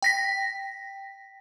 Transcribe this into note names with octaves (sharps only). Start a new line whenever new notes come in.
G5 A#6 B6